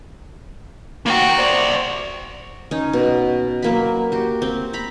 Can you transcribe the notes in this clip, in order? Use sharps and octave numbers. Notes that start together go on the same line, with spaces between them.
A#3 F#4 G5
C5 D5
C#4 D#4
B2
F#3 A#3 B5
F#4 G4
C4
A#5 B5